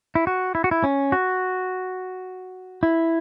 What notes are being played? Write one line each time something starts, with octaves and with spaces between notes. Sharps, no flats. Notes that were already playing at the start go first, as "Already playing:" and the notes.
E4
F#4
E4
F#4
E4
C#4
F#4
E4